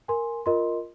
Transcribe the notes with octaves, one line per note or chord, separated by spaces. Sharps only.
A#4 G#5 C6
F4 A#4 D#5 C6